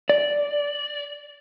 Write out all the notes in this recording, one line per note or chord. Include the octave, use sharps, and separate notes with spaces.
D5